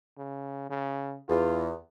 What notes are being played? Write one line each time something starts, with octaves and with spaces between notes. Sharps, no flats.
C#3
C#3
E2 F4